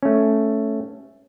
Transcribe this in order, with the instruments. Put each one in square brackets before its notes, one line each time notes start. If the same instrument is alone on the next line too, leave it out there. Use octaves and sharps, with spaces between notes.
[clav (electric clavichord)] A3 C#4